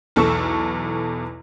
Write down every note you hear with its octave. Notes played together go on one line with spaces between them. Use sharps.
B1 E2 A4 C#6 E6 E7